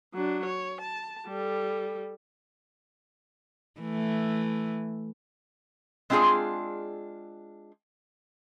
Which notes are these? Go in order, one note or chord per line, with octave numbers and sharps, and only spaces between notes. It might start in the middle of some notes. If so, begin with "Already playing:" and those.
F#3 D4
C#5
A5
G3 A4
E3 A3
G#3 C4 D4 F4 G#4 D5